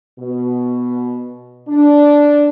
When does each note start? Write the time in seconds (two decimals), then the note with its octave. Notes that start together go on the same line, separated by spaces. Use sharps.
0.19 B2
1.67 D4